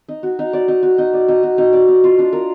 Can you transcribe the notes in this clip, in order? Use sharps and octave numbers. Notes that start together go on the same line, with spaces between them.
D#4
F#4
D#4
D5
D#4
F#4
D#4
D5
D#4
F#4
D#4
D5
D#4
F4
D4
A#4